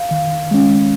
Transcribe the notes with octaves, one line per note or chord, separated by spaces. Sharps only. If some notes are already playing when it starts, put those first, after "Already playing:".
Already playing: F5
D#3
G#3 C#4